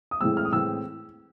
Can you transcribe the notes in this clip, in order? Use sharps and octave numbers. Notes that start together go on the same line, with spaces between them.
D#6
A2 E3 G#3 C4 E6
F6
D#6
A2 E3 G#3 C4 E6